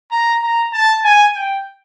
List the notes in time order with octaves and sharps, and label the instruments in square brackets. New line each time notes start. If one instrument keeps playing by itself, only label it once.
[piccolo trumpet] A#5
A#5
A5
G#5
G5